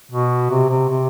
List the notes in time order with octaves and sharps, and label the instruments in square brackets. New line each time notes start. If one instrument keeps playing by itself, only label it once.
[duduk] B2
C3
C3
C3